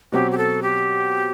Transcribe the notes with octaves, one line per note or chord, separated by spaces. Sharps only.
B2 F#3 C4 F#4 G4
G4
A4
G4